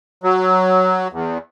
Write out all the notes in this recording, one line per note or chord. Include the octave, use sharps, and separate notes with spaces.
F#3
E2